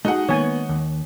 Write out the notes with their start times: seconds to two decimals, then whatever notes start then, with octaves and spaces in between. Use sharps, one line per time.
0.05 A3 D#4 F#4 G#4 F#5
0.29 D#3 G#3 A#3 B3 C#5 G#5
0.69 D#2